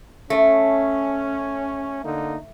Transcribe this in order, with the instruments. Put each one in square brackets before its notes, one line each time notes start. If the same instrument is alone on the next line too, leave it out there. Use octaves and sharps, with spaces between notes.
[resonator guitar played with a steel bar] A3 [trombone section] C#4
[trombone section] D3 A#3 D#4